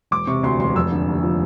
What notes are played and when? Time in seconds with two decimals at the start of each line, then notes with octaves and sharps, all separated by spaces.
0.11 E1 D6
0.27 C3 C#6
0.43 D2 C6
0.59 E1 C6
0.75 F1 E6
0.92 D3
1.07 D#2
1.23 F3